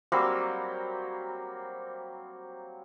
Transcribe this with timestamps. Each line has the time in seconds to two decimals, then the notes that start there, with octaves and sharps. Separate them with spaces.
0.12 F#3 G3 A#3 C4